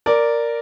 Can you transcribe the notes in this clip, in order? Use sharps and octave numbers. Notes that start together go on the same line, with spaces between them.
A#4 D5